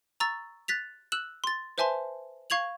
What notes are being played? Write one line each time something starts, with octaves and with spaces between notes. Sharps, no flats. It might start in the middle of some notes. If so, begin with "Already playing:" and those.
A#5 C#6 E6 A6
F#6 A6 B6 F7
E6 F#6 E7 F#7
C6 A6
B4 C5 E5 G#5 A5 C6
F5 C#6 G#6 F7 F#7